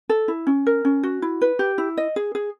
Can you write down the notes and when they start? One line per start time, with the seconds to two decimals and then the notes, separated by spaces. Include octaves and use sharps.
0.09 A4
0.28 E4
0.47 C#4
0.67 A#4
0.85 C#4
1.03 F#4
1.22 E4
1.41 B4
1.59 G4
1.78 E4
1.97 D#5
2.16 G#4
2.35 G#4